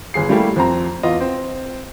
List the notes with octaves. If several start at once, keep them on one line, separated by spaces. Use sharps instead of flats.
G1 G#4 C7
G3 A3 A#3 E4 G4
F2 C4 A#5
E2 F4 D#5
C4